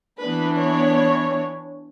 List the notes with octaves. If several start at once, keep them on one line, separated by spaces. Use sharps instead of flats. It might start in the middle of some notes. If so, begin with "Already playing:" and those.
E3 B3 D4 B4
C#5